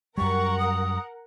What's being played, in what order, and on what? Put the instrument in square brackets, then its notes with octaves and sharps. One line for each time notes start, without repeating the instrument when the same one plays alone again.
[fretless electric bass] F#2 G3 [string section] A#4 F#5 [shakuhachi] C#6
[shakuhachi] D#6